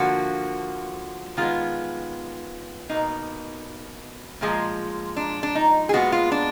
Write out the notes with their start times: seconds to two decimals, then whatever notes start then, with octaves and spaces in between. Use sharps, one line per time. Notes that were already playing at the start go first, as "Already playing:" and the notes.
Already playing: D3 F3 A#3 F#4
1.37 D#3 G#3 B3 F4
2.89 B2 A#3 D#4
4.41 A#2 F3 G#3
5.17 D4
5.43 D4
5.55 D#4
5.89 G#4
5.93 A#2 G#3 B3 F#4
6.12 F4
6.32 D4